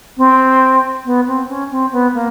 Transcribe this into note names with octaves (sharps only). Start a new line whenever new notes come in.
C4
B3
C4
C#4
C4
B3
A#3